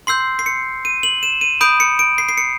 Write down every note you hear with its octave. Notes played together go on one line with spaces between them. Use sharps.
C6 E6 G6 C7
C7
C#7
D#7
F#7
E7
D#7
B5 D#6 G6 D7
C#7
D7
C7
C7
C#7